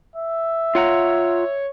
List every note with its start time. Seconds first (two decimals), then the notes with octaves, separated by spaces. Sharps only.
0.16 E5
0.75 F4 C#5 F#5 A#5